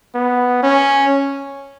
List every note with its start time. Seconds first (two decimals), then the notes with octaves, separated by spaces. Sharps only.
0.15 B3
0.63 C#4